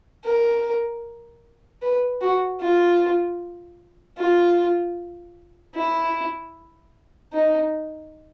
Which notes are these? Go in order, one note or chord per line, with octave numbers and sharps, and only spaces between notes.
A#4
B4
F#4
F4
F4
E4
D#4